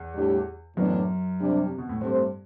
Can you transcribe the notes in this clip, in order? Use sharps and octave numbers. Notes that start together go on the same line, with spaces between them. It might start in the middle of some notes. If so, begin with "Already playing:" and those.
Already playing: E2
A2 G3 D4 G4
F#2 A2 E3 B3 D4
C3 G3 D4
C3
B2
A2
G2 A3 C4 G4 C5